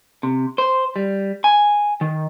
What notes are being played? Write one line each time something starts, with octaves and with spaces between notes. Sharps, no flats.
C3
C5
G3
G#5
D#3